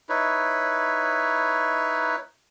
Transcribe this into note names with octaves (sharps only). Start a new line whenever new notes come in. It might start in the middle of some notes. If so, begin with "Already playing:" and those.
D#4 E4 B4 C#5